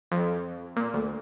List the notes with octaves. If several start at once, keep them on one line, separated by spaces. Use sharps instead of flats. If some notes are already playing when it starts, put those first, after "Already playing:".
F2
A#2
D2